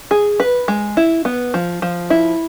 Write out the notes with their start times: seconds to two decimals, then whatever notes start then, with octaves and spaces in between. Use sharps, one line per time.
0.11 G#4
0.40 B4
0.68 G#3
0.97 E4
1.25 B3
1.54 F3
1.82 F3
2.10 E4